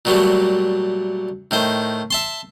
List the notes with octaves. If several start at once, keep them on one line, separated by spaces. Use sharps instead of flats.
A#2 F#3 G3 A3
A2 D#3 C5
E5 A5 C6